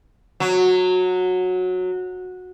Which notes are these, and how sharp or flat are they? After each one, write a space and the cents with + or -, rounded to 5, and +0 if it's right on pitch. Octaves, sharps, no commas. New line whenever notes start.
F#3 -15